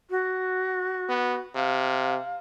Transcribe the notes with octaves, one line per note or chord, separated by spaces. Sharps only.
F#4
B3
C3 F5